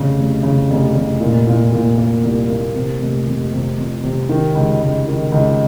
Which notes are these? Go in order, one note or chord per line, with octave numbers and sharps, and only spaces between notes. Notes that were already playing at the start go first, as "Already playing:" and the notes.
Already playing: F1 C#3
F1
C#3
F1
F1
A#2
A#2
A#2
A#3
C2
A#3
C3
F1
F1
C3
F2
C3
D#3
C#2
C#2
D#3
C#2